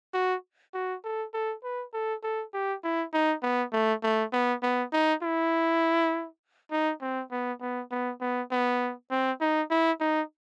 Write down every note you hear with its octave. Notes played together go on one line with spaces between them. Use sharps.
F#4
F#4
A4
A4
B4
A4
A4
G4
E4
D#4
B3
A3
A3
B3
B3
D#4
E4
D#4
C4
B3
B3
B3
B3
B3
C4
D#4
E4
D#4